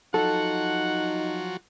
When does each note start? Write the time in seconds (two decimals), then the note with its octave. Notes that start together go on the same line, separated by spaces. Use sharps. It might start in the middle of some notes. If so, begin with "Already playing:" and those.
0.14 F3 F#3 D#4 F#4 A4 F#5